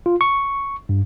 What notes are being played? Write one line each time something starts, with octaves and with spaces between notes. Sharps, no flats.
F4
C#6
G2